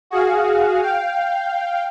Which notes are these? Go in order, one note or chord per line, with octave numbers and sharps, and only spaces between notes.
F#4 G#4 F5
F5 G5